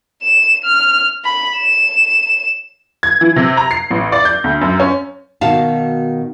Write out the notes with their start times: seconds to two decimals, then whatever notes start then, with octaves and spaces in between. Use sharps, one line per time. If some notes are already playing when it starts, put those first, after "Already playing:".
0.23 E7
0.65 F6
1.25 B5
1.57 E7
3.03 G#6
3.21 E3
3.36 C3
3.57 A#5
3.71 C7
3.90 A1
4.12 D5
4.25 G6
4.44 D2
4.61 F#2
4.80 C#4
5.41 B2 D#3 F#4 F5 A5